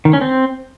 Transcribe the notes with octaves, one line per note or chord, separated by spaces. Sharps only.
D#3
C#4
C4